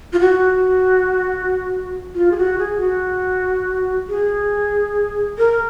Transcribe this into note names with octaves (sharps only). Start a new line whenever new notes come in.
F4
F#4
F4
G#4
F#4
G#4
F#4
G#4
A#4